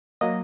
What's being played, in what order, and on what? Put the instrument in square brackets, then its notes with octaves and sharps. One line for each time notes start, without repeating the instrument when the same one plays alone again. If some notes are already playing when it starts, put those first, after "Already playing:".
[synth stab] F#3 A#3 D#5